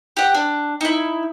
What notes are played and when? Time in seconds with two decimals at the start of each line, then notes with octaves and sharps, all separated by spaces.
0.17 G4 F#5
0.35 D4
0.81 D#4 E4